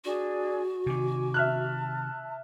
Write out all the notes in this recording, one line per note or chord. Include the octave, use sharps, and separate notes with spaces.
D4 F#4 G#4
C3 D#3 G#5 D6
E5 A5 F6 F#6